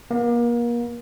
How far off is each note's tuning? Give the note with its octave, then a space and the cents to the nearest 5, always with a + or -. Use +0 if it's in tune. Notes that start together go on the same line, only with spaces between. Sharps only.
A#3 +35